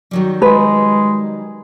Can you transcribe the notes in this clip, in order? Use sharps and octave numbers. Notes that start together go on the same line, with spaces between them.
D#3 F#3 G3
G#3 B4